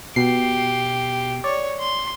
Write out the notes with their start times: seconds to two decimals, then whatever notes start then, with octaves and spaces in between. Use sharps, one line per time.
0.16 B2 G4 C7
1.44 C#5 D5
1.80 C6